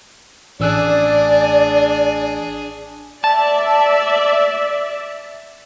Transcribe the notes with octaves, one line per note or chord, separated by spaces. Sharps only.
A1 D4 G#4 D5 E6 F#6
D5 E5 A5